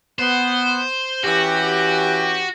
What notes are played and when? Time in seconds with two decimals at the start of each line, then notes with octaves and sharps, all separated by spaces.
0.19 B3 C5
1.24 E3 C#4 F#4 G4